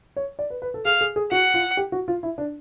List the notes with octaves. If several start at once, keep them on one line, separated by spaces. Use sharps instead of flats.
C#5
D5
B4
B4
A4
G#4 F5
G#4
G#4
F#4 F#5
F4
G4
F#4
F4
E4
D4